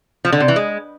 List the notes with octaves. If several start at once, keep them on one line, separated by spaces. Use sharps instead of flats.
F3
D3
C3
E3
G#3